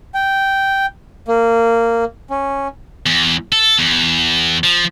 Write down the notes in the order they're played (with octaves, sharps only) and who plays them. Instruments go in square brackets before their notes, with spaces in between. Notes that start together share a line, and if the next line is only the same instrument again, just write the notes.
[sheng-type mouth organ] G5
A#3
C#4
[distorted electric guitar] E2
A4
E2
F3